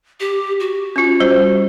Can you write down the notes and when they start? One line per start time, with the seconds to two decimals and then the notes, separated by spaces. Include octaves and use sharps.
0.20 G4
0.60 F#4
0.96 C#4 F4
1.20 G3 C5